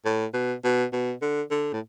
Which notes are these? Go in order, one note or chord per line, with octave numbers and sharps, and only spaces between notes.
A2
B2
B2
B2
D3
D3
A2